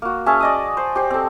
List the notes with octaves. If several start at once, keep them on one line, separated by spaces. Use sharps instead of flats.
A#3 F#4
C#4 G#4 E5 A5
D5 D#5 D#6
C5
G4 C5
C4 A4